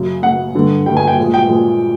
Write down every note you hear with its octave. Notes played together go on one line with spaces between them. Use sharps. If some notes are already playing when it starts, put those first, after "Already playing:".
Already playing: F#2 C#3 F#3
F#2 C#3 F#3 F#5
G2 D3 G3
G2 D3 G3 G5
G#5
G5
A#2 F3 G#3
G5
A#2 F3 G#3